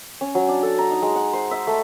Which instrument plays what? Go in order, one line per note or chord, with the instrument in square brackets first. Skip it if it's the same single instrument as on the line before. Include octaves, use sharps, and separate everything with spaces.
[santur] C#4
F#3
D4
A4
A#5
D#4
G#3
F#5
C5
E5
A3